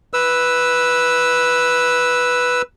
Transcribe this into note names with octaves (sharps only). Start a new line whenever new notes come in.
B4 E6